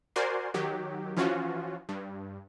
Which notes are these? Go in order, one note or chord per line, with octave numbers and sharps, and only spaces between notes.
F#4 A#4 C5 D5 G#5 C6
D#3 F#3 G4
E3 F3 C#4 F4 F#4
G2